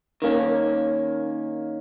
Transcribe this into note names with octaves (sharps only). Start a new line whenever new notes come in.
D#3 A#3 C#4